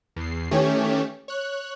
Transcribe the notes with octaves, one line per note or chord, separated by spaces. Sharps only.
E2 C7
D#3 E3 A3 C#4 G4 C#5
C#5 F#6